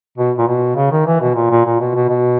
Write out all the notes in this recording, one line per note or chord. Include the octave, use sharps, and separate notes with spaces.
B2
A#2
B2
C#3
D#3
E3
B2
A#2
A#2
A#2
B2
B2
B2